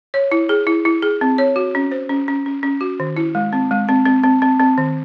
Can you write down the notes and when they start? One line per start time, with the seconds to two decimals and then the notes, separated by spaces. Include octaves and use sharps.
0.14 C#5
0.32 E4
0.49 G#4
0.67 E4
0.85 E4
1.02 G#4
1.21 C4
1.38 C#5
1.56 F#4
1.75 C#4
1.91 C5
2.09 C#4
2.28 C#4
2.46 C#4
2.63 C#4
2.81 F#4
3.00 D#3
3.17 E4
3.35 G#3
3.53 C4
3.71 G#3
3.88 C4
4.06 C4
4.23 C4
4.42 C4
4.60 C4
4.78 D#3